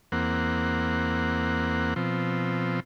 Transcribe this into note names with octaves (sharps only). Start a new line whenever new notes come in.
E2 A#3 C4 F#5
B2 F3 C4